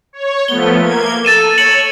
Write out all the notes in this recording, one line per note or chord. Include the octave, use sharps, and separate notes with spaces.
C#5
F3 A3 B3 G7
A#3 G#6
A4 A6 D#7 E7
C#5 C#7 F#7